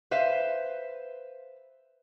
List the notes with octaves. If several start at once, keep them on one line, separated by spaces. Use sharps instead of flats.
B4 C5 E5 F5